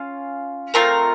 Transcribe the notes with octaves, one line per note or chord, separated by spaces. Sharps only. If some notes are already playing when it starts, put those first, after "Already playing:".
Already playing: C#4 F4 F5
A3 C4 F4 A#4